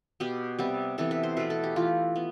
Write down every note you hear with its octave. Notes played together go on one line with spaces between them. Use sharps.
B2 B3 G4
C3 G3 B3
C3 E3 B3 A4
B4
C5
B2 A3 B4
A4
G4
E3 A3 F4
B3